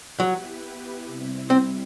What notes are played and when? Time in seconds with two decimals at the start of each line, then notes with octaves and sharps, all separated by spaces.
0.20 F#3 B3 E4 G4 B4
1.06 C3 G3 C4 E4
1.50 C4